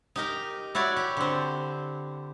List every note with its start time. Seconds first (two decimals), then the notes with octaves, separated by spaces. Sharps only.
0.16 D#4 G4 A#4
0.75 E4 F#4 C#5 D5
0.96 G4
1.17 D3 C4